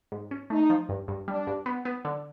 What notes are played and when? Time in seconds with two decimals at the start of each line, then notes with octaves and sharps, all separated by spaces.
0.12 G#2
0.31 C#4
0.50 A3 D#4
0.70 F3
0.89 G2
1.08 G2
1.28 G3 D4
1.47 G2
1.66 B3
1.85 B3
2.05 D3